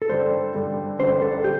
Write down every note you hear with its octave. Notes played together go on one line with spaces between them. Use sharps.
A4
G2 D3 G3 C5
G2 D3 G3
G1 G2 D3 G3 C5
A4
G3 G4